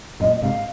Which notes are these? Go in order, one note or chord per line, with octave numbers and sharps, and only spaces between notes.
F#2 A#2 D#5
D#5
G#2 C3 F5